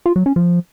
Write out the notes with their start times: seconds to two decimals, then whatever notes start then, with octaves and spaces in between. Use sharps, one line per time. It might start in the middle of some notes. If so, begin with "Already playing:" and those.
0.06 F4
0.16 F#3
0.26 C#4
0.36 F3